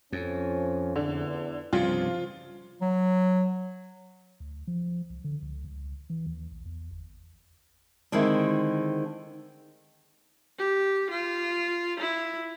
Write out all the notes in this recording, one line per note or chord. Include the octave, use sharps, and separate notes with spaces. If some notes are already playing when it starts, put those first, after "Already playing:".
F2 F3 C#4
E2 D3
C2 G2 C#3 F3 F4
F#3
D2
F3
C2
D3
C#2
C#2
E3
D#2
A#1
E2
G1
D3 D#3 G#3 C4 E4
G4
F4
E4